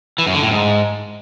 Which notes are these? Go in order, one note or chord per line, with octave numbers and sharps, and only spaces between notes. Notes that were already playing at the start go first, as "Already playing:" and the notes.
E3
F#2
D3
A2
G#2